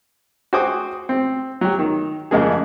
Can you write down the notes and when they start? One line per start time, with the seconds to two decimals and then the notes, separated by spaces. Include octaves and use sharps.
0.53 F#4 G#4 C5 G5 D6 D#6
1.09 C4
1.61 F#3 G4
1.79 D#3
2.31 F2 C#3 G#3 A#3 G#4